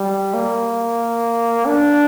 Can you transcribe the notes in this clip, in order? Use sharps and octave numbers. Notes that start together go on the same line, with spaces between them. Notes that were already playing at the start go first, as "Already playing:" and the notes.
Already playing: G3
A#3
D4